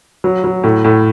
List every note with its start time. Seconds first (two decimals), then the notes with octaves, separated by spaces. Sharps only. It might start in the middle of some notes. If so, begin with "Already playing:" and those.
0.24 F#3
0.44 F#3
0.64 A2
0.84 A2